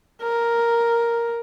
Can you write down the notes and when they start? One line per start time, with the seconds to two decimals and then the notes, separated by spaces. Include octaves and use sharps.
0.22 A#4